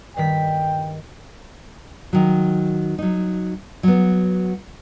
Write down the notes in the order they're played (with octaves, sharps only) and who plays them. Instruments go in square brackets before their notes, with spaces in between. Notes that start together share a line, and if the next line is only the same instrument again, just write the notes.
[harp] G2 D#3 B6 [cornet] G5
[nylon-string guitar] D#3 F#3
F#3 D#4
F#3 B3